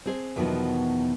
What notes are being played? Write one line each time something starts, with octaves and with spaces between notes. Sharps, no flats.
C4 G#4 C5
E2 B2 D#3 F3 F#3 B3